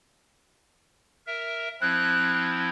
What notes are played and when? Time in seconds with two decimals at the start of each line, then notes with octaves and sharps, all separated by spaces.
1.27 A#4 E5
1.81 F3 C4 E4 F#6